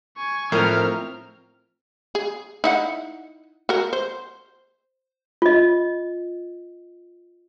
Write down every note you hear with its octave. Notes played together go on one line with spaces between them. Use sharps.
G#5 C#6
A2 F3 A3 C4 A#4 F6
G#4
D#4 E4 F#5
F#4 A#4
C5
F4 D#5